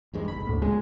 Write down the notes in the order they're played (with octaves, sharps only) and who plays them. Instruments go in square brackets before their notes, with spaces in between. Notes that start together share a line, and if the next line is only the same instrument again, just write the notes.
[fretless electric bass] E2 G2 G#3
[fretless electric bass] F#1 B1 [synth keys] B5
[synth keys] D2 A2
[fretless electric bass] F#1 A#2 C#3 [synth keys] G#3